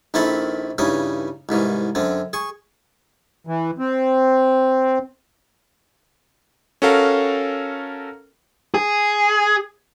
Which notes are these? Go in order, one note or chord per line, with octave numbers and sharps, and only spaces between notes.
A#1 D#3 C4 E4 A4 B5
G2 C#3 E3 D#4 C#5
C2 G#2 D#3 E3
F#2 D3 C4
G#4 C#6
E3
C4
C#4 F#4 A4 A#4 F5
G#4